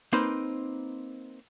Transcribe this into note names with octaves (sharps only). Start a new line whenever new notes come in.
A#3 C4 D#4 B4 C5